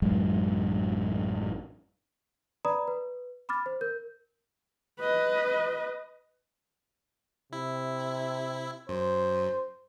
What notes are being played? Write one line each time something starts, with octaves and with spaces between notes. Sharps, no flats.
A1 F#2 F#3 G#3
B4 D5 A#5 B5 D#6
B4
B5 D6 F6 A6
C5
A#4 G6
B4 D#5
C3 E4
F#2 C5